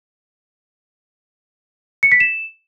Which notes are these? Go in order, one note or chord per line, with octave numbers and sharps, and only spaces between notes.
C#7
B6
E7